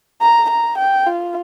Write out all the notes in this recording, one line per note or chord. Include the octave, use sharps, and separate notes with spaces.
A#5
A#5
G5
F4